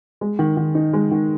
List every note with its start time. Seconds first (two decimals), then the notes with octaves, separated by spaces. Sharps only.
0.21 G#3
0.39 D#3
0.57 D#3
0.75 D#4
0.93 G#3
1.11 D#3